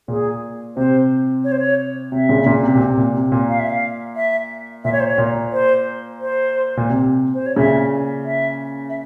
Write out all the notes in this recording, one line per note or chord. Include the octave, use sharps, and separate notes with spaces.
A#2 G#4
C3 C5
C#5
C5
C#5
C3 E5
A#2 C#3
A#2 C#3
C3
A#2
C3
A#2
C3
A#2
F5
E5
F5
E5
A#2 E5
C#5
C5
C#5
A#2
C5
C5
A#2
C3
C5
C#5
A#2 C#3 E5
E5
E5